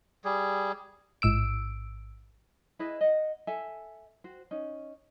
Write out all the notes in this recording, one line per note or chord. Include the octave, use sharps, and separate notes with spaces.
G3 G#4
A1 G#2 E6 D7
E4 G#4 B4 D#5
D#5 F#5
A4 E5 G#5
F#4 C5
C#4 D#4